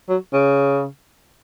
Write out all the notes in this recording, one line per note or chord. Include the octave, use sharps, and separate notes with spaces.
F#3
C#3